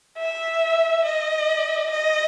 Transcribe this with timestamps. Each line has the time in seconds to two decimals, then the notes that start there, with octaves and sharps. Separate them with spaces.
0.18 E5
1.04 D#5
1.91 D#5